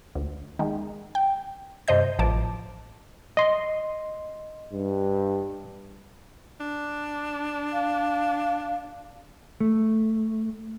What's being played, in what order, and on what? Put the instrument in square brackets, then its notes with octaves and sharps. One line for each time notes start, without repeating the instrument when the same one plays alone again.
[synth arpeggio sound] D2
D#3 G#3
G5
G2 C3 C5 D#5 G6
A1 F3 A5 D6
[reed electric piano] D#5 C6
[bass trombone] G2
[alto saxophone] D4
[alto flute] F5
[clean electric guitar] A3